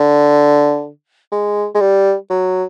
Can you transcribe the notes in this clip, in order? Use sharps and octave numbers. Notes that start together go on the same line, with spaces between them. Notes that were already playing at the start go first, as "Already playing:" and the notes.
Already playing: D3
G#3
G#3
G3
F#3